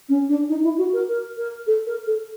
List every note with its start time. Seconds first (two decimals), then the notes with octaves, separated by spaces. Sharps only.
0.09 C#4
0.29 D4
0.49 D#4
0.64 E4
0.78 F#4
0.93 A#4
1.09 A#4
1.38 A#4
1.67 A4
1.87 A#4
2.07 A4